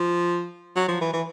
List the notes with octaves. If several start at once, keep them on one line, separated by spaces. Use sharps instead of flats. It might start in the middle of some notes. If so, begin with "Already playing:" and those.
Already playing: F3
F#3
F3
E3
E3